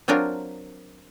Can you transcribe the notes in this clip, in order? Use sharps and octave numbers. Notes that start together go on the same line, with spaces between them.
F#3 C4 D4 F4 A#4